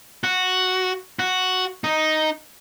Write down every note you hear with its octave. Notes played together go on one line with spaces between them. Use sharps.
F#4
F#4
D#4